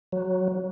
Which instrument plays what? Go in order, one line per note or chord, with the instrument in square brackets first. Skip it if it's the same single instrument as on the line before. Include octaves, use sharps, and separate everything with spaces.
[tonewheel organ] F#3